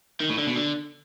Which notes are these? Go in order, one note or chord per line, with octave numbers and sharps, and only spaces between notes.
D#3
A2
D3
B2
D3